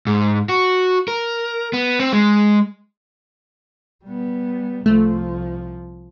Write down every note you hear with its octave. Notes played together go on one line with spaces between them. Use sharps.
G#2
F#4
A#4
B3
C4
G#3
G3 B3
C2 F3 A3